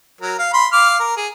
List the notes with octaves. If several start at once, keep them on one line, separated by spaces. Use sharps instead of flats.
F#3 A#4
F5
B5 C6
F5 D6 F6
A#4
G#4